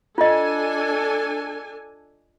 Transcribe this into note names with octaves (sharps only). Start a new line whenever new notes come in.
D4 F4 A4 D#5 G#5